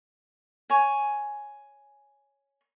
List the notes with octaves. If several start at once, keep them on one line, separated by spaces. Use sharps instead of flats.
C#5 G#5